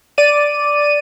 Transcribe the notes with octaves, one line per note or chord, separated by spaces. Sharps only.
D5 D#7